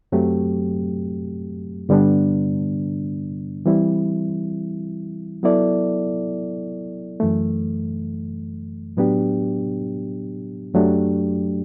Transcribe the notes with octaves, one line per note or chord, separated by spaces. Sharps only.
F#2 F#3 A3 C4 G4
G2 D3 G3 B3 D4
E3 G3 C4 E4
F#3 B3 E4 A4 D5
F#2 E3 A3
A2 F#3 B3 D4 G4
F#2 F#3 A3 D4 G4